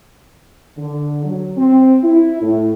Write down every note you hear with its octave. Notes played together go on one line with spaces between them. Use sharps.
D3
F#3
C4
E4
A2